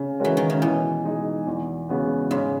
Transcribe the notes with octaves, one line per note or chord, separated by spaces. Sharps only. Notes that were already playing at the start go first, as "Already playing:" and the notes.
Already playing: C#3
E3 G#3 C#4 F#4 A#4
D#3
C#3
B2 E3
G#3 D#4 G#4
E2
C#3 G#3 B3 F#4
G#2 C#3